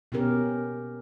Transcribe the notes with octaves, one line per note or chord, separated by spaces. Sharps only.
B2 B3 C#4 G4 A#4